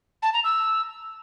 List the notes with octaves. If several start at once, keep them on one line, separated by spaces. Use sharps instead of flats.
A5
A#5
E6